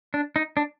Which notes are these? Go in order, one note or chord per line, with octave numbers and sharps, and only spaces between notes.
D4
D#4
D4